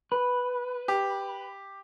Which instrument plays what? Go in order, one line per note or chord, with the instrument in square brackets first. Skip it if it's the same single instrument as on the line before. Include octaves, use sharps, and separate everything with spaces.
[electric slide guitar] B4
[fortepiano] G4